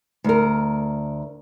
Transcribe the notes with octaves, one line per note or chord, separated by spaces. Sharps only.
D2 A#4